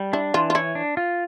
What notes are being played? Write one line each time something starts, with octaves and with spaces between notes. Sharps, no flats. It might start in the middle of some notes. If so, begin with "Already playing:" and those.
Already playing: G3
D4 E4
E3 F4
F4
E4 C#5
D4
F4